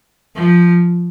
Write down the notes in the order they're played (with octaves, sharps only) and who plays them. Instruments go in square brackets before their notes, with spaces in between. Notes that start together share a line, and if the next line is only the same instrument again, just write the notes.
[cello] F3